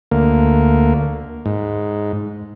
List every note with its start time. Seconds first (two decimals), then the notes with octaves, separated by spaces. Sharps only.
0.11 D2 A#3
1.46 G#2